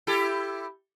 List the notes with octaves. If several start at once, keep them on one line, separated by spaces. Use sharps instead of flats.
E4 G4 A4